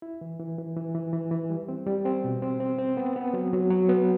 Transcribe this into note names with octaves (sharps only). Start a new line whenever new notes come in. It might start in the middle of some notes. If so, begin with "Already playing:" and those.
E4
E3
E3
E3
E3
E3
E3
E3
G3
C4
G3
C4
B2
C4
C4
C4
B3
B3
F#3
F#3
F#3
B3